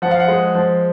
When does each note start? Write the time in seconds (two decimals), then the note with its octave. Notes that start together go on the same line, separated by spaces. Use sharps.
0.02 F3 F#5
0.11 F5
0.20 F#5
0.28 G#3
0.54 F3